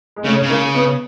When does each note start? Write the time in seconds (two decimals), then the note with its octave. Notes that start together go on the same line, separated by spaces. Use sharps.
0.16 G#3
0.24 C#3 A3
0.42 C#3
0.50 A#3
0.75 B3